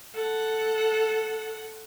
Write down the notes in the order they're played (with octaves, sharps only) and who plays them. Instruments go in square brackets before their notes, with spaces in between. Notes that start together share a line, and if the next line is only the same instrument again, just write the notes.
[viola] A4 F#5